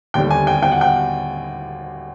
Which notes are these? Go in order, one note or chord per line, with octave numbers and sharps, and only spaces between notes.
D#2 D3 G3 G5
G#5
G5
G5
F#5
G5